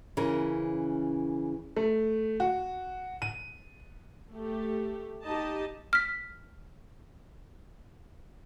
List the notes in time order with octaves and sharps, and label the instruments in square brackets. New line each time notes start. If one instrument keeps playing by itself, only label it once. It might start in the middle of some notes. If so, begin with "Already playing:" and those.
[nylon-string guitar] C#3 E3 C#4 A#4
[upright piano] A3
F#4
D#7
[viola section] A3 G4
D#4 G4 D#5 A5
[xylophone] F6 B6